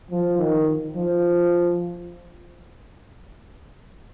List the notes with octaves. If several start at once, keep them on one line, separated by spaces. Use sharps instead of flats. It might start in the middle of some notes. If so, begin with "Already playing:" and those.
F3
D#3
F3